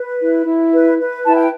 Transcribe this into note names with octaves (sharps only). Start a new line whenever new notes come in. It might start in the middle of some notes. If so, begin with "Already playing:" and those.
Already playing: B4
E4
E4
B4
B4
E4 A5
G5